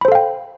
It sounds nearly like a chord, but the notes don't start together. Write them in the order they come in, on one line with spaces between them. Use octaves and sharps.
B5 C5 A4 F5 G5